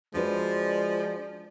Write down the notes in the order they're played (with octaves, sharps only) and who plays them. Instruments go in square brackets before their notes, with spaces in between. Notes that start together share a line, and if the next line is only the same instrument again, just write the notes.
[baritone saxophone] F3 [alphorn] G#3 [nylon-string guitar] D4 F#4 B4 [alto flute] D5